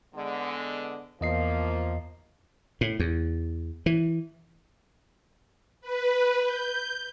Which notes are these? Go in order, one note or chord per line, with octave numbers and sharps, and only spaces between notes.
D3 G#3 B3
E2 F3 A#3 D#5 C7
A2
E2
E3
B4
G6